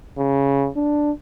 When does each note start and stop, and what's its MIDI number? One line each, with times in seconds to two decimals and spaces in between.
0.18 0.69 49
0.76 1.11 62